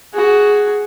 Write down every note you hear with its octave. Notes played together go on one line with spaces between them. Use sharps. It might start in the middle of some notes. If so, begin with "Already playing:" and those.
F#4 G#4